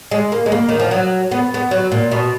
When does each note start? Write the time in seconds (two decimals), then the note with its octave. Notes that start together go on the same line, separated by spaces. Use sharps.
0.11 G#3
0.32 A#3
0.46 G#3
0.52 A#3
0.69 D#3
0.79 F3
0.91 F#3
1.31 B3
1.54 B3
1.71 F#3
1.92 A#2
2.12 B2